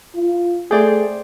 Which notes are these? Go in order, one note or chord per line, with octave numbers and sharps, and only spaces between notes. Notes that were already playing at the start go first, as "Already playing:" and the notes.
F4
A3 G#4 C5 D5 G5